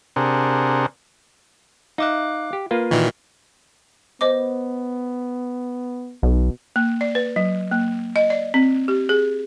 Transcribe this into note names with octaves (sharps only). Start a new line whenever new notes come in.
C3 D4 G#4 A#4 C5 F#5
D#4 E5 F5 D6 F#6
G4
A#3 F4 A#4 B4
A#2 D#3 E3 F#4
B3 C5 D#5 D6
B1 B2
A#3
D5
B4
F#3
A#3
D#5
D5
C4
G4
G#4